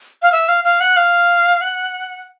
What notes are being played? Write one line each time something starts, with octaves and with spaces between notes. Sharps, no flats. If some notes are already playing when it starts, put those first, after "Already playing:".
F5
E5
F5
F5
F#5
F5
F#5